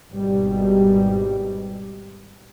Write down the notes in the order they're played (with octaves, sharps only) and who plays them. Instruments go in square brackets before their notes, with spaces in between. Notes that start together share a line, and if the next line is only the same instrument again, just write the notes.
[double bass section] G#1 G#2 B2 G3